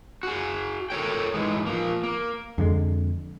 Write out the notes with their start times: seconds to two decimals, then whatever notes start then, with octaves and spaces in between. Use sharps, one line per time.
0.23 F#4 G#4
0.90 A4 A#4 C#5 G5
1.34 G#2 E3 G#3
1.66 F3 A#3
2.03 A#3
2.58 F2 D3 G#3